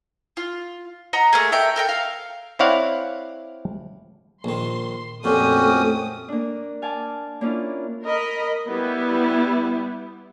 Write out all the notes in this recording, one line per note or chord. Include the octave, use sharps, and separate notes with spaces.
F4
D#5 F#5 A#5
A3 A#3 G#4
A4 A#4 E5 G5
A4 A#4 G5
F5
C4 E4 C#5 D5 F5 F#5
A#1 D#3 C6
F2 A#2 A3 C4 C#4 F#4 G4 D#6
A#3 D4
F5 G#5 A5 D6
A#3 C#4 D4 E4 F4
A#4 D#5 B5
G3 B3 E4